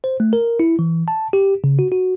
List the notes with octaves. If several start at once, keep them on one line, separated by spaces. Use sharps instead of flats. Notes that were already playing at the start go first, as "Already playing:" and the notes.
C5
A3
A#4
E4
E3
A5
G4
C#3
F#4
F#4